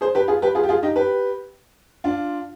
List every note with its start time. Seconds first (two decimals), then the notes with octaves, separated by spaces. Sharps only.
0.01 G#4 C5
0.15 G4 B4
0.28 F4 G#4
0.42 G4 B4
0.55 F4 G#4
0.63 G4
0.69 F4 G#4
0.83 D#4 G4
0.96 G4 B4
2.04 D4 F4